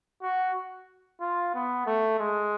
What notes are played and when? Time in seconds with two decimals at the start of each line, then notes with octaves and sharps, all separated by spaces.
0.23 F#4
1.20 F4
1.54 B3
1.86 A3
2.19 G#3